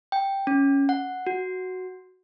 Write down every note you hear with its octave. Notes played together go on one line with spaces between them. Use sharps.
G5
C#4
F#5
F#4